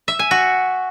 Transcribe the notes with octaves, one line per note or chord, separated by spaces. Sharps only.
E5
G#5
F#4